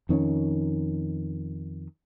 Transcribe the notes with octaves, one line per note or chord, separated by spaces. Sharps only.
F2 D#3 C4 C#4